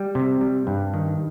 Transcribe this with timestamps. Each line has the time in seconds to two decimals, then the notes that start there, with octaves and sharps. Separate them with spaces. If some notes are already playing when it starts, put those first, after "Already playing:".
Already playing: G3
0.15 C3
0.41 G3
0.67 G2
0.94 D#3